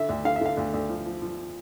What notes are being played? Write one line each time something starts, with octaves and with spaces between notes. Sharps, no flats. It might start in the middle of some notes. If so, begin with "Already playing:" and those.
Already playing: D3 E5
D2
D3 F5
E5
D3 F5
D2
D2
F3
F3
F3